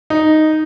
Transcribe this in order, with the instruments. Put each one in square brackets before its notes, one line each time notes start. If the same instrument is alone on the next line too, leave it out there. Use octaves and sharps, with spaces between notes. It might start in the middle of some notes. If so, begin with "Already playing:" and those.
[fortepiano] D#4